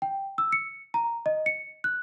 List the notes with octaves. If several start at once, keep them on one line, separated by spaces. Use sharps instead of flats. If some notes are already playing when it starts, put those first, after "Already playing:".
G5
E6
C#7
A#5
D#5
C#7
F#6